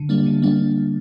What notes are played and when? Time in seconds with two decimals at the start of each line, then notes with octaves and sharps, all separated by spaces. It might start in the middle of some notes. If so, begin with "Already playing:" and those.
Already playing: D3
0.09 G3 A#3 D4
0.26 D3
0.42 G3 A#3 D4